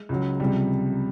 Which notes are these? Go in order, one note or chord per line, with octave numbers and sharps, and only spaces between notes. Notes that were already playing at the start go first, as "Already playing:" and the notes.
Already playing: G#3
C#2 C#3 F#3
C#2 C3 F3 G3